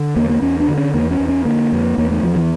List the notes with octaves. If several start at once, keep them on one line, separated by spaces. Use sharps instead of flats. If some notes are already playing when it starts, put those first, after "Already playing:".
Already playing: D3
E2 A#3
A#3
E2 C#4
D4
D3
C#4
E2 A#3
C#4
E2
C#4
D3 A#3
F2
E2 A#3
A3
E2 F3
E3